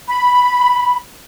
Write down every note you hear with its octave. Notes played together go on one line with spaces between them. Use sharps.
B5